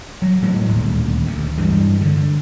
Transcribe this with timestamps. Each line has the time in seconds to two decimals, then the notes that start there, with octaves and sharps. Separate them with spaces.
0.22 F#3
0.42 A2 F#3 G#3
0.68 D#1 D2
1.26 D2
1.57 G2 E3 G#3
2.01 D3